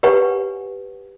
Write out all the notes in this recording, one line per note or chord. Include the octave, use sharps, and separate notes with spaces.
G4 B4 C#5 F#5 G#5